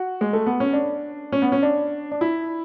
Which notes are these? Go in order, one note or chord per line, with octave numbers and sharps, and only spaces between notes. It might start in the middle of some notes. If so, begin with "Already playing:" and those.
Already playing: F#4
G#3
A3
B3
C#4
D4
C#4
B3
C#4
D4
D4
E4